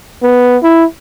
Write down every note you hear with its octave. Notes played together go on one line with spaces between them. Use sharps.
B3
E4